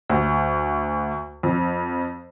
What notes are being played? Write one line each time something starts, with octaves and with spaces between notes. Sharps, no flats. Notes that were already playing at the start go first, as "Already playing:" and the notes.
D2
F2